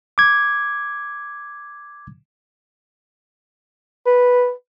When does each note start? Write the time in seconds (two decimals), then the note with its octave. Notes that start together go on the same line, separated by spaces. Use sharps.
0.18 D6 G#6
4.06 B4